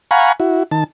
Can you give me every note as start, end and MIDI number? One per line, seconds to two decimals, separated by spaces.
0.11 0.32 77
0.11 0.32 78
0.11 0.32 80
0.11 0.32 82
0.11 0.32 83
0.11 0.32 85
0.40 0.63 64
0.40 0.63 66
0.71 0.84 51
0.71 0.84 81